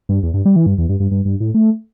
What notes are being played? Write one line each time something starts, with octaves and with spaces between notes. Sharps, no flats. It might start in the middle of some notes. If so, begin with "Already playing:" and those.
G2
E2
G2
G3
E3
G2
E2
G2
G2
G2
G2
A2
A3